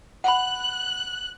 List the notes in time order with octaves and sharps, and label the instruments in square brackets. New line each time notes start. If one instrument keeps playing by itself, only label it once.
[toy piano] F#5 B5 [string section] F#6